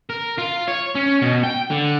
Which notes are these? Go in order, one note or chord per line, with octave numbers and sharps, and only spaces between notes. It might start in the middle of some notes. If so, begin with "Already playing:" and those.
A#4
F4
C#5
C#4
B2
G5
D3